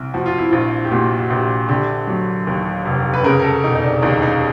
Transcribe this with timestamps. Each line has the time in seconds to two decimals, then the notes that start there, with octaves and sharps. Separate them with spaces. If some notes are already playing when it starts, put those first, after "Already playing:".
Already playing: C2
0.14 F3 F#4
0.26 F4
0.38 E4
0.51 A#1 F4
0.85 G4
0.91 A#2 F#4
1.18 F#4
1.30 A#1 G4
1.68 D3 G4
2.07 F#3
2.47 D#2
2.86 F1
3.14 B4
3.24 C#3 A#4
3.39 A#4
3.44 A4
3.64 E1 D#4
3.75 D#4
3.83 D4
4.02 D#2 D#4
4.22 D#4